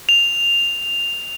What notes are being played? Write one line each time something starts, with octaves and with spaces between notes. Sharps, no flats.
F7